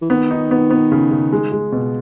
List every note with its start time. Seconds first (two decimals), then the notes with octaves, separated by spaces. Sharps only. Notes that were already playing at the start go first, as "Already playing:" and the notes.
0.02 E3
0.10 D#3 B3
0.31 D#4
0.51 B3
0.70 B3
0.92 C#3
1.11 C#3
1.33 G#3
1.52 G#3
1.72 B2